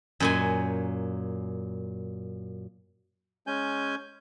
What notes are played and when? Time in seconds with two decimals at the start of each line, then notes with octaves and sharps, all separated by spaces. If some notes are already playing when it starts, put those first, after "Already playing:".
0.20 F#2 A#2 G#5
3.47 G#3 C#4 G#5 G6